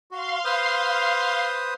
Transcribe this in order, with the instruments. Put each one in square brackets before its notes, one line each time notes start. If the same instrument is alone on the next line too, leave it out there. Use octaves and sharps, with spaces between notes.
[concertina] F#4 [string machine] F5 C6
[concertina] B4 C5 D#6